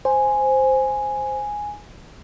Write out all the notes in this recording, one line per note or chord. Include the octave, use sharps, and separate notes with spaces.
C5 G#5